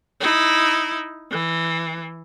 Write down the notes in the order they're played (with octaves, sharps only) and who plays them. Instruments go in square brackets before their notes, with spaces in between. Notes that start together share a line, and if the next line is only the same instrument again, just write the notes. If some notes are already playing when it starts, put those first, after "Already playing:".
[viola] D#4 E4
E3